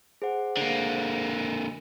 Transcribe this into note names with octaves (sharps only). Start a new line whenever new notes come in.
G#4 C5 F#5
D3 A#3